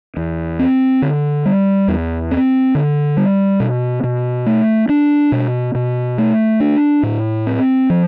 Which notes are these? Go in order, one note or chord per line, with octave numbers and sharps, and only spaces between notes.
E2
C4
D3
G3
E2
C4
D3
G3
B2
B2
A3
D4
B2
B2
A3
D4
A2
C4
F3